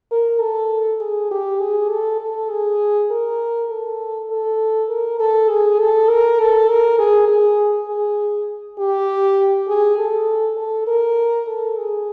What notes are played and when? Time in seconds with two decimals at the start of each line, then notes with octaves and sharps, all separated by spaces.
0.11 A#4
0.40 A4
1.00 G#4
1.31 G4
1.60 G#4
1.89 A4
2.20 A4
2.50 G#4
3.10 A#4
3.70 A4
4.30 A4
4.89 A#4
5.20 A4
5.49 G#4
5.79 A4
6.09 A#4
6.39 A4
6.68 A#4
6.98 G#4
7.28 G#4
7.88 G#4
8.79 G4
9.68 G#4
9.98 A4
10.57 A4
10.87 A#4
11.47 A4
11.77 G#4